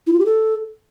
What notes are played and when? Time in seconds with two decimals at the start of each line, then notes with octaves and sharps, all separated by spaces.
0.07 E4
0.13 F4
0.19 G4
0.26 A4